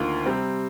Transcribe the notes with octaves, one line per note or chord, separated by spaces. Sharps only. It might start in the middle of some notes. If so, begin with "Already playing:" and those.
Already playing: D2 D#3 A#3 F4
C3 G3 C4